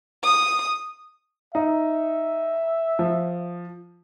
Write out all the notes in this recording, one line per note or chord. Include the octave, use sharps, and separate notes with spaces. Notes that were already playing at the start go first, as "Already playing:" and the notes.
D#6
D#4 E5
F3